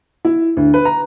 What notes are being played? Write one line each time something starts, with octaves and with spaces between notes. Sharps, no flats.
E4
D2
B4
A#5